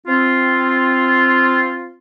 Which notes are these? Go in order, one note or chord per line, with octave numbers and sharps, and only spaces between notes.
C4 F4